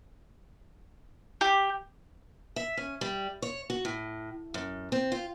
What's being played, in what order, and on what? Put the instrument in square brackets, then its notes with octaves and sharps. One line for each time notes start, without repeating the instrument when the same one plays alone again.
[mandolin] G4
[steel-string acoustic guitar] E5
C#4
G3
C#5
F#4
A2
F#2
C4
F4